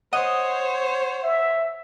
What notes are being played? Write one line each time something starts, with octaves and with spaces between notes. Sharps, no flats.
C5 C#5 D#5 F#5
E5